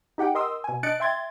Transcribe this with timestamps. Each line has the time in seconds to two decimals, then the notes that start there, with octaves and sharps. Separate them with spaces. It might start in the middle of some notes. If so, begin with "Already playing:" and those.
0.18 D#4 G4 F#5 G5
0.35 A#4 D#5 C6 D#6 E6
0.64 B2 G#5
0.83 D4 D#5 F#6 A6 C#7 D7
1.00 E5 G5 C6 G#6 A6